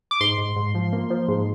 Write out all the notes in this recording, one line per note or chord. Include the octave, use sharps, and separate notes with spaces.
D6
G#2 C6
G#2
G#2
F3
A#3
F3
G#2